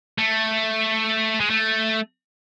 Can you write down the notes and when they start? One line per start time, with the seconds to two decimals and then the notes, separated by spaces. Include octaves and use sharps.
0.18 A3
1.40 G#3
1.50 A3